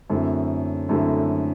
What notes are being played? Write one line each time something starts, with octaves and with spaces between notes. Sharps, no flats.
F#2 D3 A3 C4 E4
F#2 D3 A3 C4 E4